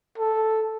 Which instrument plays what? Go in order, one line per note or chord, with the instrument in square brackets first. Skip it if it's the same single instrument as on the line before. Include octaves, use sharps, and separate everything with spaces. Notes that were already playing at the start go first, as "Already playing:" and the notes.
[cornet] A4